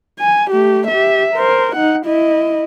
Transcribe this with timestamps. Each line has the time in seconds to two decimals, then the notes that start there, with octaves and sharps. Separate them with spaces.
0.20 G#5
0.51 A3 G4
0.88 G4 E5
1.35 A#4 C5
1.75 D#4 F#5
2.06 E4 D#5